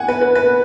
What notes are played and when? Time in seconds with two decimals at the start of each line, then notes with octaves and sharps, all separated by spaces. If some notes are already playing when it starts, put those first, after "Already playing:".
Already playing: F#5 G#5
0.08 B4
0.21 B4
0.35 B4